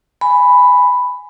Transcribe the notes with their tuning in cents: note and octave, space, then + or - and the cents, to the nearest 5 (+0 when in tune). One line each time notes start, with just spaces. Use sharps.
G#5 +0 B5 +5